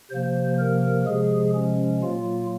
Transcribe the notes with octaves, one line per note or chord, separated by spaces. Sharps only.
C3 F3 A#3 C5
A#4
C3 F3 G#3 G#4
C#4
A#2 F#3 A#3 F4